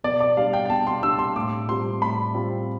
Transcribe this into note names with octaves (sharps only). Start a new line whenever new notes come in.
B2 D5
D5
G3 D4 F5
G5
G5
B2 A5
C6
G3 D4 E6
C6
A2 D6
G3 C4 F4 C6
A2 B5
G3 C4 F4